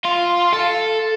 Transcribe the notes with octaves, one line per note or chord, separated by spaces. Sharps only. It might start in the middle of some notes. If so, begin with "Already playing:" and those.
F4
A4